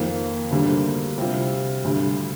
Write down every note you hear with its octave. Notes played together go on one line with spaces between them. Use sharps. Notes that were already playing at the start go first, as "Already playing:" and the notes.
Already playing: F2 D#3 A#3
D2 D3 G3 A#3
C3 G3 C4 F4
D2 D3 G3